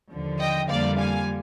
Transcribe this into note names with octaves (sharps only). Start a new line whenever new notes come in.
D#2 D3 F3
D#5 G5
F2 D3 G3 A#3 D5 F5
F5 G#5